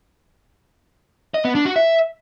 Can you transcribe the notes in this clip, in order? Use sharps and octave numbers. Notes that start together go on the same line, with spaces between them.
D#5
B3
D4
F#4
E5